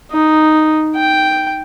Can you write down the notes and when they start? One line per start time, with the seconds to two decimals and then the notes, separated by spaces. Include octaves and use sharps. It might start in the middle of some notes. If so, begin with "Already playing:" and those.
0.11 D#4
0.95 G5